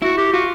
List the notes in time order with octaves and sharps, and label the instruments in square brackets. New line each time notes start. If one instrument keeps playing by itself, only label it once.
[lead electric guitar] E4 [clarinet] F#4
[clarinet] G4
[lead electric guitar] F4 [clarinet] F#4